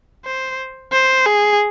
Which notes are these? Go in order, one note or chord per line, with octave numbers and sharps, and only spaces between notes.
C5
C5
G#4